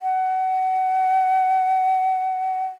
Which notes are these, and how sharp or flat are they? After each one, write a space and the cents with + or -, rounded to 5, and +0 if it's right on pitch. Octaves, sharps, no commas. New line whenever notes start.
F#5 +25